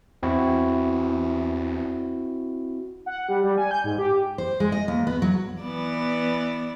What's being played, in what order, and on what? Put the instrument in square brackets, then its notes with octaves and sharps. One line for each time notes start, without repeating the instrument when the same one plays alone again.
[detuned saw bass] E2 [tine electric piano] C4 E4 F#4
[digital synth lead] F#5
G3
G3
G#5
G6
G#2
G4
[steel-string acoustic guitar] C5
G#3
D#5
D#2
B3
F#3
[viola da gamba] E3 B3 D5